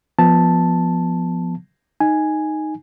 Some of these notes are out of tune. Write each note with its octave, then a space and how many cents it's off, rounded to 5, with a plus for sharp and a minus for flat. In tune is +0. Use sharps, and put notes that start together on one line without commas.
F3 +0 B3 +0 A5 +0
D#4 +0 G#5 +0